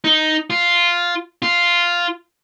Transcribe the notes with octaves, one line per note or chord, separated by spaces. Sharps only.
D#4
F4
F4